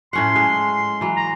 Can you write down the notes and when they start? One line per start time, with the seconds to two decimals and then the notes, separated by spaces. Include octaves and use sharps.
0.13 A2 C#4 F#5 C6
0.36 G#3
1.01 E3 F#3
1.16 A#5